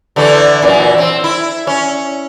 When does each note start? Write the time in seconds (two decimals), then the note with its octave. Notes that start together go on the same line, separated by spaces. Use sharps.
0.16 D3 E3 A3
0.62 F#2 A#2 E3
0.98 C4
1.24 E4
1.67 C#4